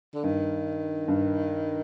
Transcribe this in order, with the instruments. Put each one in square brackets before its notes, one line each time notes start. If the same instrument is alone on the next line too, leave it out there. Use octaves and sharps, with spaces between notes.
[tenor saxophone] D3
[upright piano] G2 [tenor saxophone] D#3
[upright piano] G2